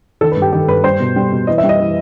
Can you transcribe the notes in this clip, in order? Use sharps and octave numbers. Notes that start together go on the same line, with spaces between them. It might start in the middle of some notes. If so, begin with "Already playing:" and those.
D#3 A4
B4
G2
G4
D#3 G4
G2 B4
G3 C5
B2
G3
B2
E3 D#5
E5
G3
D#5
E3